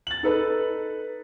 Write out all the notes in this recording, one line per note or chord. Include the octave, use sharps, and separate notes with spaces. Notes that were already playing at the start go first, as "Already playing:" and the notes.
A6 F#7
D#4 A4 B4